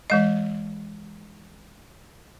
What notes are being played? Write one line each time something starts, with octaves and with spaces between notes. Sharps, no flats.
E3 G#3 D#5